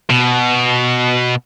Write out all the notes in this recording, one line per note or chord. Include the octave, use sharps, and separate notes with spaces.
B2